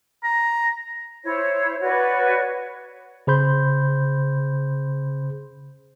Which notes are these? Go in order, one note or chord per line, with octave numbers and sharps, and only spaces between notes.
A#5
E4 C5 C#5
F#4 B4 C#5 D5
C#3 G#4 C5 B5 C6 G6